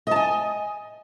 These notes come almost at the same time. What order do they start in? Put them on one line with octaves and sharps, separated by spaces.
D#5 A5 G#5